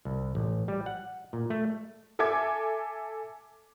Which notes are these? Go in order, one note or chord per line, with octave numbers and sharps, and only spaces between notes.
C2
A1
G3
F#5
A#2
A3
A4 E5 G#5 D6 G#6